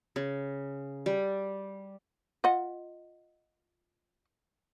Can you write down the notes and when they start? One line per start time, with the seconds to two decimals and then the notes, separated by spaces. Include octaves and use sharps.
0.16 C#3
1.06 G3
2.44 F4 D#5 F#5